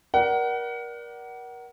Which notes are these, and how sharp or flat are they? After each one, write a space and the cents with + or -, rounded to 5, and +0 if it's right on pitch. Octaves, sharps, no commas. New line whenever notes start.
A#4 +30 D5 +0 F#5 +25